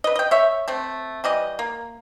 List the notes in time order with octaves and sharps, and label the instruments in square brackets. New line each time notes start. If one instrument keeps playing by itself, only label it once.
[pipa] B4 D#5
D#5 G5
C#5 E5
A3 C4
E3 G3 D#5
A#3